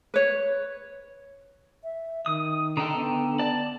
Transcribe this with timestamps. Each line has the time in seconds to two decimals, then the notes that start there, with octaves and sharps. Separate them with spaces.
0.14 B4 C#5
1.84 E5
2.26 D#3 D#6
2.77 D3 A4 G5 A#5
2.94 B3
3.39 D5 A5